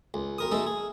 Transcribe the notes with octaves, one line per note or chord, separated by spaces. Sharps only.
C#2
B1 A#4 D#6
B2 G#3 A3 D#4 A4
G#4